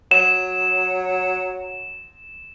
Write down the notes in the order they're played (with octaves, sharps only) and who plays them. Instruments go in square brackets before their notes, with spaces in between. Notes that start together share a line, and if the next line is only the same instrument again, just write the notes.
[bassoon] F#3 [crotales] E7